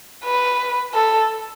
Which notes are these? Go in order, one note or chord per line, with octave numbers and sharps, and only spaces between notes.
B4
A4